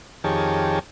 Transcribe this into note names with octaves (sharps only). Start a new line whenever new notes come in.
F2 D#3 G4 G#4 C#5 A5